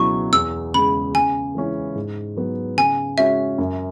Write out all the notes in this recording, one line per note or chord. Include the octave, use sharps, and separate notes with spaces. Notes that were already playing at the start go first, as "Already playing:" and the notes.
Already playing: C#2 B2 F#3 E4 C#6
E2 E6
C#3 G#3 B5
C#3 G#5
E3 G#3 C#4 E4
G#2
F#3 B3
C#3 G#5
G#3 C#4 F#4 E5
F#2